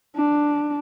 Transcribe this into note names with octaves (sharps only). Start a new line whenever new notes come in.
D4